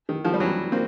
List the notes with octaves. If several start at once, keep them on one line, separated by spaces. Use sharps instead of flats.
D#3
D#3 F3
G3
E3 F#3
A#3 C4